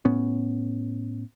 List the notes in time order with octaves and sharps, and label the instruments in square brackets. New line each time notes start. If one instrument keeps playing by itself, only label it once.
[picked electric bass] A2 B3 C#4